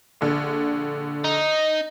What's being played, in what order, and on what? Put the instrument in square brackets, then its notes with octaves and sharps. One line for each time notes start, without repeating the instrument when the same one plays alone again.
[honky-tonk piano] A#1 D3
[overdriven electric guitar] D#4